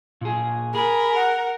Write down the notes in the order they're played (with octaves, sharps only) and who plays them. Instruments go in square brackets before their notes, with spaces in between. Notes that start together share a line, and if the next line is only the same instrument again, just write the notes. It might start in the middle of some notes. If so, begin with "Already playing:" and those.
[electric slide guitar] A#2 G#4
[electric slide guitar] G#4 [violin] A#4 [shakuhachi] B5
[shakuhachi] F#5